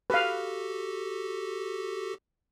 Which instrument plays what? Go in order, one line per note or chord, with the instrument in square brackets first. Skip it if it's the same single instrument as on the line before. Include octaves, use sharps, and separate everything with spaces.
[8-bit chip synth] F#4 G4 A4 [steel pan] B4 F5